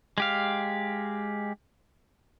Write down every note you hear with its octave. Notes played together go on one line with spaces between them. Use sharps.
G#3 G4 F5